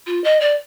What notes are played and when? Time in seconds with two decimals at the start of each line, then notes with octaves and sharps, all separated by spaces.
0.07 F4
0.24 D#5
0.40 D5